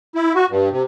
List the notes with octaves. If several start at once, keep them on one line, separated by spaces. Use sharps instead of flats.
E4
F#4
G2
C3